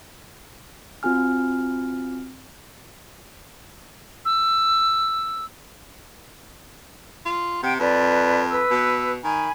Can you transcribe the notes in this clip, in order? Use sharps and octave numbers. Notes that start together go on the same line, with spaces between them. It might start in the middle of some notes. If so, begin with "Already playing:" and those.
C4 F4 F#4 G#5 F6
E6
F4
C3 F#5 G5
F2 B4 D5
B4 E6
B2
D#3 G#5 B5